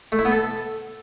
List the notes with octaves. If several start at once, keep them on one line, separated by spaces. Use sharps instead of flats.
A3
E4
B3
A4